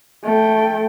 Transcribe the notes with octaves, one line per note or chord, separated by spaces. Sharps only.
A3 G5